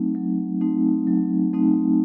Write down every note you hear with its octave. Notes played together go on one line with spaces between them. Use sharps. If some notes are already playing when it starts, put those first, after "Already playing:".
Already playing: F#3 A3 C4 D#4
F#3
A3 C4 D#4
F#3
A3 C4 D#4